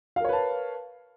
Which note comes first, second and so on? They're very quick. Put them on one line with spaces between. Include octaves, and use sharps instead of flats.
F5 A#4 C#5 B4 A5